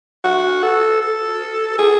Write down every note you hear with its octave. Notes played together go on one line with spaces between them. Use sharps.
F#4
A4
A4
G#4